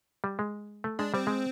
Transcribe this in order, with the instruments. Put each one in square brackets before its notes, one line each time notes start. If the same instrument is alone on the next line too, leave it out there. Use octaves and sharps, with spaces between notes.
[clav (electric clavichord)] G3
G#3
A3
[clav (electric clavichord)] G#3 [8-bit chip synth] D4
[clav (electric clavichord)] G3 [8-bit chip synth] C4
[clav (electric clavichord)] G#3